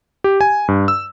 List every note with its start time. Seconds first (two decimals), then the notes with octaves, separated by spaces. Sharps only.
0.24 G4
0.41 G#5
0.68 G2
0.88 E6